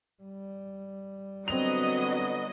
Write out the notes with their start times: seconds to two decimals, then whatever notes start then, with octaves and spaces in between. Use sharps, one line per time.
0.23 G3
1.48 D3 F#3 B3 C4 D#5 F7